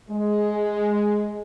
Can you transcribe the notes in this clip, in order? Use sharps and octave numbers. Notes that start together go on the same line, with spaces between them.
G#3